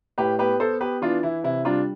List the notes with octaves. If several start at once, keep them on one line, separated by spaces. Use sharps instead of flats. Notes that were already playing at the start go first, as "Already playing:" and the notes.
A2 G4 B4
B3 G4 B4
B3 A4 C5
B3 G4 B4
E3 D4 F4
E3 E4
C3 E4
G3 D4 F4